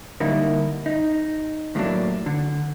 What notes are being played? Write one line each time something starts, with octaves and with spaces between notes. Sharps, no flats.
D3 G3 A#3 D#4 E4 A#4
D#4
D#2 A2 F#3 A3 A#3 D4
D3